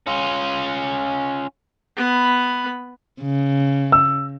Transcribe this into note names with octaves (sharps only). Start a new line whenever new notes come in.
C#4 F4
B3 B5
C#3
E6